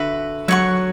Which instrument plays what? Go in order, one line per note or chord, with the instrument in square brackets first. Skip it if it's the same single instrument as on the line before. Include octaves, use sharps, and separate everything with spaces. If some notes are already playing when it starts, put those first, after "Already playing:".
Already playing: [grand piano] D3 [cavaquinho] F#4 B4 E5 B5
[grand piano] F#3 [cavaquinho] C#5 F#5 C#6